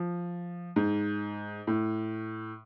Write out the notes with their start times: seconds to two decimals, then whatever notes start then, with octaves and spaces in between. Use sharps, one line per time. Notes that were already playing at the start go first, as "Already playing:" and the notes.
Already playing: F3
0.76 G#2
1.67 A2